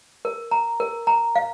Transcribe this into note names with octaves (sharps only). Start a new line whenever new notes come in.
A#4
A#5
A#4
A#5
F5